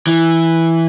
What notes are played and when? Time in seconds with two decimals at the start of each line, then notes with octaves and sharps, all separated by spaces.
0.07 E3